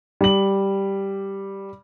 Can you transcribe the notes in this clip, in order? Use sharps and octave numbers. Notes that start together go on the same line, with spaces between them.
G3 F#7